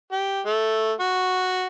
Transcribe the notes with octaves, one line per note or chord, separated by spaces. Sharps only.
G4
A3
F#4